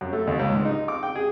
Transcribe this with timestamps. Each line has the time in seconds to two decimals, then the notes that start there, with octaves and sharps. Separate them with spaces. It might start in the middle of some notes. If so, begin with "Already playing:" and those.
0.01 F#2
0.13 A3
0.27 D#2
0.39 C#2
0.52 G#2
0.65 D#4
0.88 D6
1.03 G5
1.15 G#4